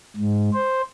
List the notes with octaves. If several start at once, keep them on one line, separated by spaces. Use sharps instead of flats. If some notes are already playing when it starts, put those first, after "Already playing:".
G#2
C5